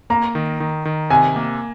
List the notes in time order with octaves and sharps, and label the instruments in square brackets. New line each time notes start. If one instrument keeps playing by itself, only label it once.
[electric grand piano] A#3 [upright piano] A#5
[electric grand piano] D#3
D#3
D#3
[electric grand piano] C3 [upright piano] G#5
[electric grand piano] A#3